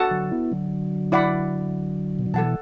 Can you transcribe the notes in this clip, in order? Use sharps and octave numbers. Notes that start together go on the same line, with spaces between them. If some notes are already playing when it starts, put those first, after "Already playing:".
Already playing: F#4 A4 F#5 A5
D3 F#3
B3 E4
D3 F#3
E4 D5 F#5 B5
B2
D3
B2 E3 A4 F#5 A5